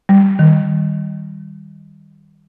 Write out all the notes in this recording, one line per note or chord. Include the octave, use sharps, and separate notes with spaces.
G3
D#3